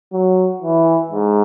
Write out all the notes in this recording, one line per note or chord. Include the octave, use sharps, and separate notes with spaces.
F#3
E3
G#2